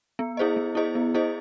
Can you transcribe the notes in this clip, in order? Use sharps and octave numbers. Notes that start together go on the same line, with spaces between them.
B3
E4 G#4 C5 D#5
B3
E4 G#4 C5 D#5
B3
E4 G#4 C5 D#5